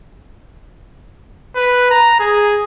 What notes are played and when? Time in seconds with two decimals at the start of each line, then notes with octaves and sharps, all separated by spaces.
1.55 B4
1.90 A#5
2.19 G#4